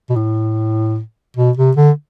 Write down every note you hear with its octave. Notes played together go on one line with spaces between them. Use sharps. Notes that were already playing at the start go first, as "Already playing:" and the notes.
B2
A2
B2
C3
D3